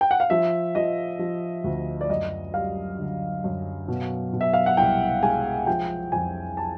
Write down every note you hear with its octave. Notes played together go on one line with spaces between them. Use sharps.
G5
F#5
F5
F3 E5
F3 D#5
F3
D2
D5
F#2 D#5
G3 F5
D3
F#2
B2
B2
E5
F5
F#5
C2 G5
G#3 G#5
F3 G5
F2 G#5
A5